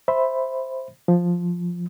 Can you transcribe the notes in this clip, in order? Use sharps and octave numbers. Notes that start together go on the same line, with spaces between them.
C5 E5 B5
F3